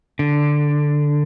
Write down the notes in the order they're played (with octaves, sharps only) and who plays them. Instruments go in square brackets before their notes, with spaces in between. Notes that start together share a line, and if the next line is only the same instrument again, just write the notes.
[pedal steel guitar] D3